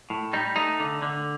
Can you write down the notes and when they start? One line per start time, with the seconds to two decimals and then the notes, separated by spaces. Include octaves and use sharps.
0.10 A2
0.33 G3 D#4
0.56 A3 D#4
0.80 D3
1.02 D3